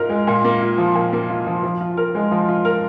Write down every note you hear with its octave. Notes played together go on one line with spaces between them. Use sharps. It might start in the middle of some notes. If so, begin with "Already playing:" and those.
Already playing: G#2 F4 A#4
G#3
A#2
A#3
F4
F3
A#2
A#3
F4
F3
F3
F4
A#4
G#3
F3
F4
A#4